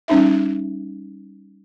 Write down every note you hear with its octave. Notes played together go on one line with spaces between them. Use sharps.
G3 C#4 D#4 E5